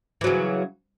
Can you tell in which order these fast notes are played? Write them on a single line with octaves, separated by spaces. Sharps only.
E3 F#3 C#3